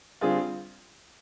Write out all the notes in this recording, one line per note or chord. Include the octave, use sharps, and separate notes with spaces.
D3 G3 C4 F4 G#4